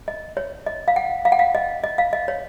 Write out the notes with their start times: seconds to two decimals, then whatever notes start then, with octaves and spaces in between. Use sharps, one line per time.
0.08 D#5
0.37 C#5
0.66 D#5
0.88 F5
0.96 F#5
1.25 F5
1.32 F#5
1.39 F5
1.55 D#5
1.84 D#5
1.98 F5
2.13 D#5
2.28 C#5